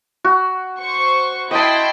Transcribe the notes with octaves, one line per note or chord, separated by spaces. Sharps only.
F#4
C5 C#6
E4 D#5 G5 A5 C6